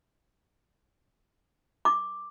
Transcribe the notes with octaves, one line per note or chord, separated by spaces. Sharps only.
D6